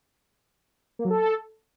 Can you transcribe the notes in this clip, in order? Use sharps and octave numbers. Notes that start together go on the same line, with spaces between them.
A#3
F#3
A4